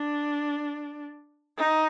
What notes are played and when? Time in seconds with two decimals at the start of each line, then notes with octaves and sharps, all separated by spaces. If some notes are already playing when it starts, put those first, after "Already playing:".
Already playing: D4
1.58 D#4